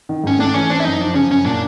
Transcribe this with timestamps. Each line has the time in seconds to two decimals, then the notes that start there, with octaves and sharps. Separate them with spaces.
0.09 D#3
0.24 G#2 C#4
0.39 A3 D4
0.54 E3 C#4
0.70 C4 D4
0.80 E4
0.85 F#2 D#4
1.01 F3 D4
1.15 C#3 C#4
1.31 F#2 C#4
1.46 A#2 D4